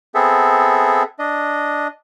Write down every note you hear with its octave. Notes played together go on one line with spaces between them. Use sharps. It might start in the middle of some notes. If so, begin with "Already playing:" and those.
B3 C4 G#4 A4 E5
D4 D#5